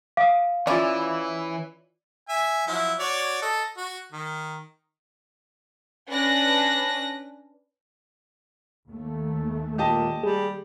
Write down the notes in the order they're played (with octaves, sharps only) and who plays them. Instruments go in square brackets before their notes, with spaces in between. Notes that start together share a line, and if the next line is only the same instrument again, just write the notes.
[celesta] F5 [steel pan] D6 D#6
[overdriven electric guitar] E3 [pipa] C#4 E4 [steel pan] F4 D5
[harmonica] E5 G#5
F3 F#3 E4
F#4 C#5 D5
A4 D#5
F#4
D#3
[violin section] C#4 D4 B4 F#6 A#6
[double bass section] D#2 A3
[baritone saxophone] A#2 [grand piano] G4 D#5 A5
[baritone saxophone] G3 [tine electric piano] G#4